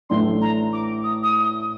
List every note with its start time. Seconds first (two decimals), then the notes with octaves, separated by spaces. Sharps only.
0.09 A1 A2 A3 D4 C6
0.41 A#5
0.73 D6
1.03 D#6
1.23 D#6